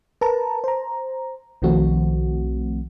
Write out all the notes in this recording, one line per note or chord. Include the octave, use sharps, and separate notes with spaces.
A#4 B4 A5 A#5
C5 A#5
B1 D#3 F3 A3 C4 F#4